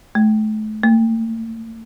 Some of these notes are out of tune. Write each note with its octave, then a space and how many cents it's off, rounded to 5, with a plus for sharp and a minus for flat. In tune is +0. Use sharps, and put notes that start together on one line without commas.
A3 -35
A3 +45